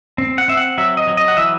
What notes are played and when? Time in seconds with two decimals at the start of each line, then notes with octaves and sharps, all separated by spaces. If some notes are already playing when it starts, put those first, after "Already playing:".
0.18 C4
0.38 F#5
0.48 C4 E5
0.57 F#5
0.78 F#3 E5
0.97 D#5
1.07 F#3
1.17 D#5
1.28 F#5
1.37 E3 E5